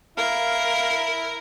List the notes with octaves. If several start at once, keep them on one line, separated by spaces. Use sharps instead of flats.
E4 A#4 F5